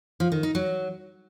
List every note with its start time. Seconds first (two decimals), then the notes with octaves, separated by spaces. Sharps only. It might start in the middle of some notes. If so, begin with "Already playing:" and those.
0.20 F3
0.32 D#3
0.43 D#4
0.55 F#3